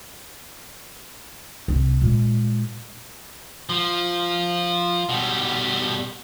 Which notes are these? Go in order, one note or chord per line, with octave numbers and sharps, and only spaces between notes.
C2
A#2 G#3
F3
B2 G3